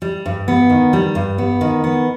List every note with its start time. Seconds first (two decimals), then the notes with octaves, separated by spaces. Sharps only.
0.02 G3
0.26 G2
0.48 B3
0.70 D#3
0.93 G3
1.15 G2
1.38 B3
1.61 D#3
1.84 B3